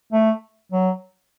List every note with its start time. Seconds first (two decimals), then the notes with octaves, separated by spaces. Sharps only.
0.13 A3
0.72 F#3